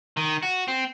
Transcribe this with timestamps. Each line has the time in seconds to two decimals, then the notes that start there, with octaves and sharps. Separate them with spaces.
0.17 D#3
0.43 F#4
0.68 C4